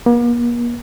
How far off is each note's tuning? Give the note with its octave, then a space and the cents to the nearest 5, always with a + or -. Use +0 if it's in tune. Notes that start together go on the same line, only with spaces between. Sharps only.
A#3 +40